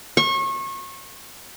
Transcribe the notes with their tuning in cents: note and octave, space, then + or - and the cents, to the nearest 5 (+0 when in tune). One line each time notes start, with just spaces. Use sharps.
C#6 -30